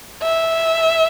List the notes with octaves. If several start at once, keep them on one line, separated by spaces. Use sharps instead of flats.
E5